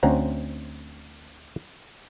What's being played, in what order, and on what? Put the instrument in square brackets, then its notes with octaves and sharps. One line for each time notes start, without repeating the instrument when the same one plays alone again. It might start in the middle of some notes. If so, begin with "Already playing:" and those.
[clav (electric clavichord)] D2 C4 C#4 F#5 A#5